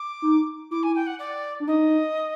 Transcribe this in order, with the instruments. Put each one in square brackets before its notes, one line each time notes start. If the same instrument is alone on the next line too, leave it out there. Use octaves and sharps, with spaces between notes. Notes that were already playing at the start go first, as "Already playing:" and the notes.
Already playing: [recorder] D6
[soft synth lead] D#4
[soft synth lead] E4 [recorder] D6
[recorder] G#5
G5
F#5
D5
[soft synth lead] D4
[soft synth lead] D#4 [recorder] D#5